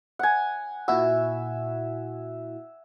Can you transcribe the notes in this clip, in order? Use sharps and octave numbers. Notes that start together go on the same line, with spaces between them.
F#5 G#5
A#2 E4 F#4 E5